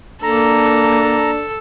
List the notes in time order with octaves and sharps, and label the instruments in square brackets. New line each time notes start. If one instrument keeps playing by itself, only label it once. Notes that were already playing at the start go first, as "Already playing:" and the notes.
[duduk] A#3 [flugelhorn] D4 [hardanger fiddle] A4 [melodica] A#5